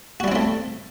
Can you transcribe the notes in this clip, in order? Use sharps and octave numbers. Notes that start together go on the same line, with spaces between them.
G3 A3 C4 E4 F#4